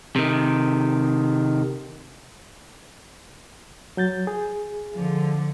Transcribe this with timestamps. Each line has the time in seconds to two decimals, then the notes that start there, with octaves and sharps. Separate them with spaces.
0.16 C3 D#3
3.97 F#3 G6 A6
4.27 G#4
4.93 D3 F3